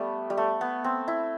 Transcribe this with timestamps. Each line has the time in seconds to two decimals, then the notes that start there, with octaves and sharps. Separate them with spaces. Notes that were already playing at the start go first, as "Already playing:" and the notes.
Already playing: G3 A3 B3
0.30 G3
0.37 A3
0.61 B3
0.84 C4
1.08 E4